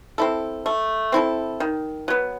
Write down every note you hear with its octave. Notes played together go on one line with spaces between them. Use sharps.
C4 E4 A4
A3
C4 E4 A4
D#3
F#3 B3